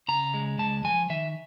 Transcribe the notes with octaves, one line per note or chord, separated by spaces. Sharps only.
C#3 A#5
G#3
C#2 A5
F3 G#5
D#3 E5